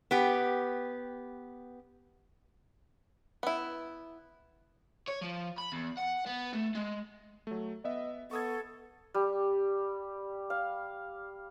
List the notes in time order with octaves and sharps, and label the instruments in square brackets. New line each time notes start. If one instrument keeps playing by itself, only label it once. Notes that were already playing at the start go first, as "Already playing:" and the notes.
[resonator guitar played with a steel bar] B3 G4
[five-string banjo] B3 E4
[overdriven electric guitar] C#5
F3
B5
E2
F#5
B3
A3
G#3
[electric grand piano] F#3 A3
[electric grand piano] B3 E5 [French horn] D#5
[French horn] B3 [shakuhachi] A4 [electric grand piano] C#6 D#6 G#6
[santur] G3
F5